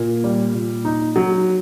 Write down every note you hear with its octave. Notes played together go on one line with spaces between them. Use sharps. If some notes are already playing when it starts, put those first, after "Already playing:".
Already playing: A#2 A#3
G3
A#2
D#4
F#3